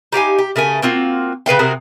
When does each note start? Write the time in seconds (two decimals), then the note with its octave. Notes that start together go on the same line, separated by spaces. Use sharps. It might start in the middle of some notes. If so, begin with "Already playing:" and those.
0.12 D#4 G4 F5 G#5
0.39 G4
0.56 C#3 A3 A#4 G#5
0.82 A#3 C4 F4 F#4
1.46 C#3 B4 F5 G5
1.59 C3 F#4 G#4 A#4